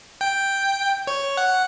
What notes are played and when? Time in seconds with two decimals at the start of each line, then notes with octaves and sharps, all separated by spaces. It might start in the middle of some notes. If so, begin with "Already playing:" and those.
0.21 G5
1.07 C#5
1.37 F#5